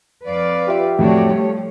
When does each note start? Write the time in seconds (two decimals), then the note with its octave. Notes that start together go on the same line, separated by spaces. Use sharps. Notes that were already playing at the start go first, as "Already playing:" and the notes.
0.24 F2 B4 D5 F5
0.68 F4 G4 E5
0.99 F2 A2 F#3 A3 D4 F#4 C#5 D5
1.30 F3 G3